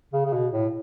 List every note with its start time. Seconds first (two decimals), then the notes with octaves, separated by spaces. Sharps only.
0.13 C#3
0.25 C#3
0.33 B2
0.52 A2